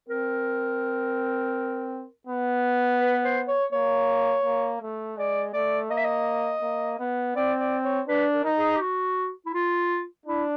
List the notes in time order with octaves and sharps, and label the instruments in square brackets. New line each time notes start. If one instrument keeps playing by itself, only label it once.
[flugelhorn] C4 [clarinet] A#4
[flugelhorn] B3
[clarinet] B4
C5
C#5
[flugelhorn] A#3 [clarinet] C#5
[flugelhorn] A#3
A3
[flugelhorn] G#3 [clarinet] D5
[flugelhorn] A3 [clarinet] D5
[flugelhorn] A#3 [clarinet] D#5
[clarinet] E5
D#5
[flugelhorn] A#3
B3
[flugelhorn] C4 [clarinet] D5
[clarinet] D5
C#5
[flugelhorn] D4 [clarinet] B4
[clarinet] A#4
[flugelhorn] D#4
[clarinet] G#4
G4
F#4
E4
F4
[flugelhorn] D4 [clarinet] E4